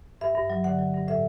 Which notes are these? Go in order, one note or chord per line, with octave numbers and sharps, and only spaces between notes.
G2 E5
G2
F#3
D3 F#5
F#3
G2
A2 E5